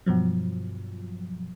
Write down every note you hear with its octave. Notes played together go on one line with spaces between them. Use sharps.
G2 B2 F3 F#3